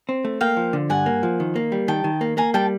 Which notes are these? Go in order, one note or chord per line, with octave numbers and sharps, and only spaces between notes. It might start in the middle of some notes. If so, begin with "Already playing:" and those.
C4
A3
A#3 F5 G5
F3
D3
G2 F#5 G#5
A#3
F3
D#3
A#3
G3
D#3 G5 A5
D#3
A#3
A#3 G#5 A#5
G3 G5 A5